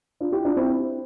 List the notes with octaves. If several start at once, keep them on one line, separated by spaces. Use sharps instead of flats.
D4 F4
E4 G4
D4 F4
C4 E4